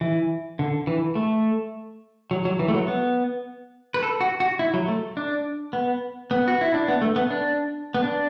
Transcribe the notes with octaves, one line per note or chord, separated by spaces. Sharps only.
E3
D3
E3
A3
F#3
F#3
E3
A3
F#3
B3
B4
A4
F#4
F#4
E4
F#3
A3
D4
B3
B3
F#4
E4
D4
B3
A3
B3
D4
B3
D4